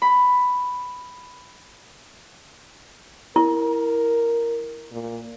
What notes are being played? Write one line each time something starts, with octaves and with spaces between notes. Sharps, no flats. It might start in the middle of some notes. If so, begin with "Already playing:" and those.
B5
E4 A#4
A#2